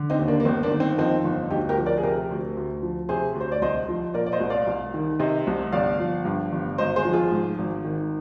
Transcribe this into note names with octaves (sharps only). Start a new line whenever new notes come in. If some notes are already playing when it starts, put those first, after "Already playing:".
Already playing: D3
C4 D#4
D#2
A#3 D4
A#3
G1 C4
A#3 D4
D#3
C4
F2 C4 D#4
G1
D2 D#4 G4
G4 A#4
F3
A#4 D5
G#4
C3 G4 A#4
D2
D2
F3
C3 G#4 C5
D2
C5
D5
C2 C5 D#5
F3
A#2 A#4 D5
D5
C5 D#5
C2
D5 F5
C2
D#3
C3 C5 D#5
C2
G1 D5 F5
F3
G2
G1
G#1 C5 D#5
G#4 C5
F3
F4 G#4
G#2
G#1
D#3